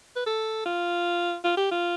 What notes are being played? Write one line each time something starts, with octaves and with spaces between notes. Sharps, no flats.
B4
A4
F4
F4
G4
F4